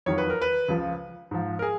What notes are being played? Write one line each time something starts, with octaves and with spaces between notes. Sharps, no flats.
F2 D#3 F#3 C#5
B4
A#4
B4
C#2 C#3 F3
G#2 F3
A#4
G#4